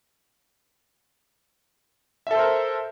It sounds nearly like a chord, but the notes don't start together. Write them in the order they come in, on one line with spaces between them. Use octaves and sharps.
E5 A4 C5 A#4